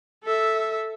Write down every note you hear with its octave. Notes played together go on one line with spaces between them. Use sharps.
A4 E5